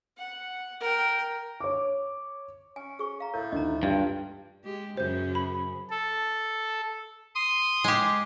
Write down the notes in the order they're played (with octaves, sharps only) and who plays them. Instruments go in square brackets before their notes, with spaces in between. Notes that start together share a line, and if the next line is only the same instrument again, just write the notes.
[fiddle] F#5
A#4 G5
[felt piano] C#5 D6
[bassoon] C#4 [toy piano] G#5
[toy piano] G#4 C5 C#6
F5 A#5
[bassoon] A2 [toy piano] A#4 [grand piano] G6
[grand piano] D2 D#3 [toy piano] D#5 A#5
[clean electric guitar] G2 [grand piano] F4
[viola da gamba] G#3 G4
[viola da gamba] F#2 C#3 C#4 [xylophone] C5 G6
[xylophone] B5
[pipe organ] A4
C6 D#6
[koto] G#3 G4